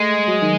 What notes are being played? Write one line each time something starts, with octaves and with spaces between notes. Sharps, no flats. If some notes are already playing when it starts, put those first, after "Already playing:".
Already playing: G#3 A3
F#3
D#3